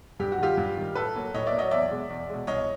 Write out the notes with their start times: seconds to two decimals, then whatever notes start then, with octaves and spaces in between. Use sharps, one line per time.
0.19 G2 G4
0.32 F#4
0.38 D#3 G3 F4 G4
0.57 G2
0.77 D#3 G3
0.95 A2 A4 B4
1.15 F#3 A#3
1.34 A2 C#5 D#5
1.47 D5 E5
1.52 A#3
1.58 F#3 C#5 D#5
1.71 E2 D5 E5
1.90 B2 G#3
2.10 E2
2.29 B2 G#3
2.47 C2 C#5 D#5